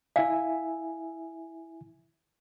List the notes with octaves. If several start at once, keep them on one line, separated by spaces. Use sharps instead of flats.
E4 E5 F5 G#5